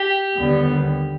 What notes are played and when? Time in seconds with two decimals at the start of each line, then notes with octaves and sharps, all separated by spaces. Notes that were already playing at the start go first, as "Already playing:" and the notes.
Already playing: G4
0.36 D#2 D3 G3 B3